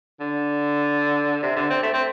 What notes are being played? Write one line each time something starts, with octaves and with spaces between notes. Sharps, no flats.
D3
C3
D3
C4
A3
C4